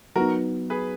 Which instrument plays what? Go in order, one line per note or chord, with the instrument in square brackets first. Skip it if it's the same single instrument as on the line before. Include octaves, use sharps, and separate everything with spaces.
[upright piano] F#3 B3 D#4 [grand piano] F#4 A#4
[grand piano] G#4 B4